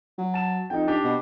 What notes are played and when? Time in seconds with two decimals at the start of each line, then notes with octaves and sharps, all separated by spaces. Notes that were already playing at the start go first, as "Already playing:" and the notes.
0.18 F#3
0.34 A5 E7
0.70 F2 D#4 G5
0.88 D4 G4
1.04 B2